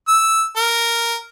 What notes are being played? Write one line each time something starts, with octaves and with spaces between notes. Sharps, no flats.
E6
A#4